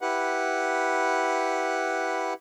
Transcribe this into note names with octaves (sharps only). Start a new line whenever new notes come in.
E4 G4 B4 F#5